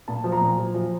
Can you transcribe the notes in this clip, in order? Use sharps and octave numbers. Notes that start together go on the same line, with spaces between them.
A#2 A5
F3
A#5
A#2
F3
F3